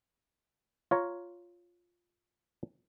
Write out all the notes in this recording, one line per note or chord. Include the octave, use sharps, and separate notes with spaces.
F4 C#5 A#5